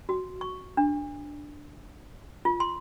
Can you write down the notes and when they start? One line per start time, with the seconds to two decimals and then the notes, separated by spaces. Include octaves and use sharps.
0.09 F#4
0.41 C#6
0.77 D4
2.45 F4
2.60 C6